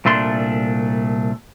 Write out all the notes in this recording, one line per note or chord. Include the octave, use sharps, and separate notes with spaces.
C2 A#2 A3 D4 C6